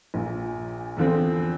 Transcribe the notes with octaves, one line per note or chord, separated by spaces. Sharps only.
A#1 A#2 F3
E2 D3 F3 C4